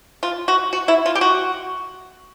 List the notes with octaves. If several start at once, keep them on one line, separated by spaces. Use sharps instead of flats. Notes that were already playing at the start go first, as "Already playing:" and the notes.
F4
F#4
F#4
E4
F4
G4
F#4